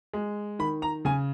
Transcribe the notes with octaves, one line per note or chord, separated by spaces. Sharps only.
G#3
D#3 B5
A#5
C#3 G#5